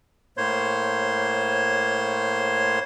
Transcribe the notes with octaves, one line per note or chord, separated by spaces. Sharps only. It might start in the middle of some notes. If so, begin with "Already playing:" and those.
A2 A#3 C5 C#5 C6